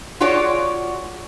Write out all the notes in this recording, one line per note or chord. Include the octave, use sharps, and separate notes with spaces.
F4 F#4 G#4 C#5 D5